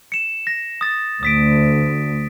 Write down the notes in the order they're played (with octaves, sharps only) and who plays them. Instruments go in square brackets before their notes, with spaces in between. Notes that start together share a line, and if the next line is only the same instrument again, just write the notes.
[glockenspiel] C#7 E7
A#6
D#6 A6
[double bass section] D2 [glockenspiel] D#6 B6 D7